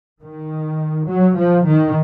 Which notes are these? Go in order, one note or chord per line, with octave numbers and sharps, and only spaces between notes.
D#3
F#3
F3
D#3